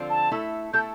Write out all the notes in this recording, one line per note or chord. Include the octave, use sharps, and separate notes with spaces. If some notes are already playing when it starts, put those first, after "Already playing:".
Already playing: D3 F3 C4 F4
A5
A3 E4 A4
A3 E4 A4 G6